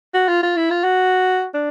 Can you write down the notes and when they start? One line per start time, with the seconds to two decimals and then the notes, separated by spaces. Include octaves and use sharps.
0.14 F#4
0.28 F4
0.43 F4
0.57 E4
0.71 F4
0.84 F#4
1.54 D4